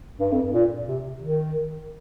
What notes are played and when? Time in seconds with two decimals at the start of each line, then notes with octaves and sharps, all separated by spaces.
0.19 G2
0.32 F2
0.43 G2
0.53 A#2
0.88 C3
1.22 D#3